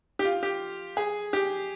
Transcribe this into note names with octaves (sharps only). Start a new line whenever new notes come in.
G4
F4
G4
G#4
G4